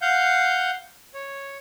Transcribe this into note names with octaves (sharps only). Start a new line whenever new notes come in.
F5 F#5 G6
C#5